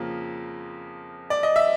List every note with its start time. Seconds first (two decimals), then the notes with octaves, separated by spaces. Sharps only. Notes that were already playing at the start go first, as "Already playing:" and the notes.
Already playing: F2 C#3 F3 A#3
1.30 D5
1.43 D#5
1.56 E5